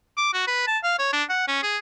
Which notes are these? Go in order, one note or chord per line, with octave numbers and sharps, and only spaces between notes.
D6
F#4
B4
A5
F5
C#5
D4
F#5
C#4
G#4